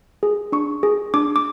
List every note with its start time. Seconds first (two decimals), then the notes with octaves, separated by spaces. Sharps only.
0.23 G#4
0.52 D4 C#6
0.83 G#4
1.14 D4 D6
1.36 D6